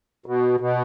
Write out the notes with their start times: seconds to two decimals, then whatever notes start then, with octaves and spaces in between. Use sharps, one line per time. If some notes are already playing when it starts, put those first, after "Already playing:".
0.26 B2
0.60 B2